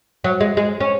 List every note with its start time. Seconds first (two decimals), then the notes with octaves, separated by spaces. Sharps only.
0.24 F#3
0.40 G#3
0.57 G#3
0.80 C#4